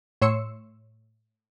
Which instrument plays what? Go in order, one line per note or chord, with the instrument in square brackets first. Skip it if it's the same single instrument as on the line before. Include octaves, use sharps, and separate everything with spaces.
[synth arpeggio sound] A2 C#5 C6 E6 C#7